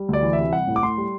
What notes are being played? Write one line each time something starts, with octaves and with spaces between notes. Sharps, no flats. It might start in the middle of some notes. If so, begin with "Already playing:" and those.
Already playing: G3
D2 D5
E3
E5
C3
G3 F#5
A2
D6
A2 C6
G3